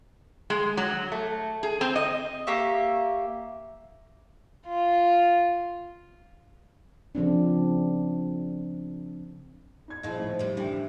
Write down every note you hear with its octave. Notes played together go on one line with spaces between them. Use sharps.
G#3
F#3
A3
G#4
C4
D#5
A#3 G4 E5 C#6
F4
C#3 F3 C4 D4
D#4 G#6
A#2 F3 E4 G#4 D#5
A2 D#3
C3 G3
A2 D3 E3 G4 G5